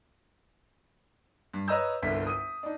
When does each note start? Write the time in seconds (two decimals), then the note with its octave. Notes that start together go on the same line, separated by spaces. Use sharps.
1.54 G2
1.68 B4 C#5 D#5 A#5 E6 G6
2.02 G1 C2 D3 B6
2.27 D#6 D#7
2.63 D4 D#4